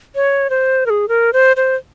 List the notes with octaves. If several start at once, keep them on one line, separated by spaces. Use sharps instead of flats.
C#5
C5
A#4
G#4
A#4
C5
C5